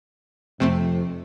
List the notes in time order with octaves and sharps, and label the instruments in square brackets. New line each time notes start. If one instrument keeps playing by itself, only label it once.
[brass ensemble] F2 [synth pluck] C3 A3 C4